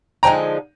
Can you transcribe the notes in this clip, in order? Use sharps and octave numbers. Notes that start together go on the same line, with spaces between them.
D3 F3 G#3 D#4 G5 A#5